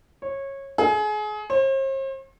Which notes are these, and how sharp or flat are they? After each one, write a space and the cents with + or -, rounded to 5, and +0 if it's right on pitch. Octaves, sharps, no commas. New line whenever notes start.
C#5 -20
G#4 +30
C5 +45